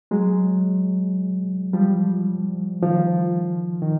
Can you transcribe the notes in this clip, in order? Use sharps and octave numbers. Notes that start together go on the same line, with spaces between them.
F#3 G#3
F3 G3
D#3 F3
D#3